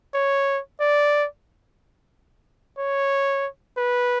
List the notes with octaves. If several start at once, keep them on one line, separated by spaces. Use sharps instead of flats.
C#5
D5
C#5
B4